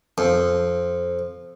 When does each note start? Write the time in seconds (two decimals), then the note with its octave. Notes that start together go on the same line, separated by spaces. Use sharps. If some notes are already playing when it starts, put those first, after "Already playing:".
0.18 F2